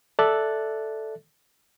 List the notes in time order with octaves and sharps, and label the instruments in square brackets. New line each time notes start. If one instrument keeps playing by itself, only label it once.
[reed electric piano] A4 D5 E5 F#6 A6